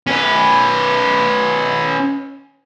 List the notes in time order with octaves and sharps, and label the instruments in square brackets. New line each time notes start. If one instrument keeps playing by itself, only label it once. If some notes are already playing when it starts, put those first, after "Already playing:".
[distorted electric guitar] C#4 B4